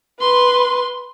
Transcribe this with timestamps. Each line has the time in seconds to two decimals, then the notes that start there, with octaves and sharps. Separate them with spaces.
0.21 B4 C6